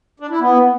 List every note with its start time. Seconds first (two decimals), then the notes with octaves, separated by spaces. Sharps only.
0.20 D4
0.30 E4
0.41 B3